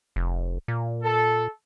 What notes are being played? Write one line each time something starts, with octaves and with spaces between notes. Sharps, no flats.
F1
A#2
A4